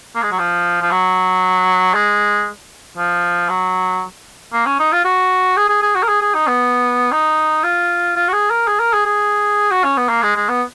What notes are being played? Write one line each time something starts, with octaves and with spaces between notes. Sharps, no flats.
A#3
G#3
F#3
F3
F3
F#3
G#3
F3
F#3
A#3
C#4
D#4
F4
F#4
G#4
G#4
G#4
F#4
A#4
G#4
G#4
D#4
B3
D#4
F4
F4
F#4
G#4
A#4
G#4
A#4
G#4
G#4
F#4
C#4
B3
A#3
G#3
G#3
B3